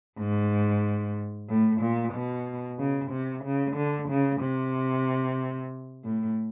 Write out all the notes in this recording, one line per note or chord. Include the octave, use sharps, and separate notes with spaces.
G#2
A2
A#2
B2
C#3
C3
C#3
D3
C#3
C3
A2